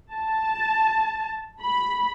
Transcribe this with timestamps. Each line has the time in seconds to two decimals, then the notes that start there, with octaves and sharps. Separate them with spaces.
0.12 A5
1.61 B5